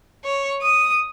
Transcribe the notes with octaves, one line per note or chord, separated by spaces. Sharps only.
C#5
D#6